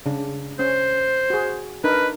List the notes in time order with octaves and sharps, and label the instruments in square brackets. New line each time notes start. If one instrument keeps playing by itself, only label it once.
[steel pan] C#3 D4
[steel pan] C#4 [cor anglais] C5
[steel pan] F#4 G#4
[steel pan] D4 D#4 A#4 [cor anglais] B4